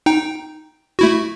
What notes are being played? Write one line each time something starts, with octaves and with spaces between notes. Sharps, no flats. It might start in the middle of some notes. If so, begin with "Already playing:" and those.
D#4 G5
A3 E4 F#4